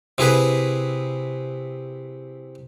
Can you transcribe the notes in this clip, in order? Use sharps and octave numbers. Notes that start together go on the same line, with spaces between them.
C3 E4 G#4 B4